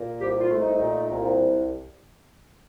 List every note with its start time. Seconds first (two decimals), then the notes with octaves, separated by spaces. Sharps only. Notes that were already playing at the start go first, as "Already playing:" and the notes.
Already playing: A#2
0.20 C2 G4
0.40 F4
0.50 A3
0.60 D#4
0.80 A#2
1.10 C2